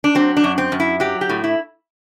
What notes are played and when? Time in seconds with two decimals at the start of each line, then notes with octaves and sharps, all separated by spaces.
0.04 D4
0.15 F#3 C4
0.37 D4
0.44 F#2
0.58 C4
0.72 F#2
0.80 E4
1.00 F#3 G4
1.21 G4
1.29 A2
1.44 E4